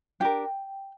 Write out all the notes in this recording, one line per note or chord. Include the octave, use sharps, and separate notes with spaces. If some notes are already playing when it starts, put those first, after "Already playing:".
D4 G4 A#4 G5